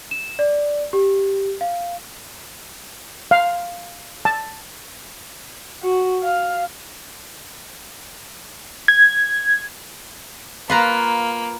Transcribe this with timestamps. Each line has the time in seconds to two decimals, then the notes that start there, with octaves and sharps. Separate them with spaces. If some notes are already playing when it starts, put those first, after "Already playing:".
0.11 E7
0.39 D5
0.93 G4
1.61 F5
3.31 F5
4.25 A5
5.83 F#4
6.24 F5
8.88 G#6
10.69 A#3 F4 B4 A#5